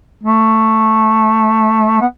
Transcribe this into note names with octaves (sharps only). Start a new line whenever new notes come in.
A3
B3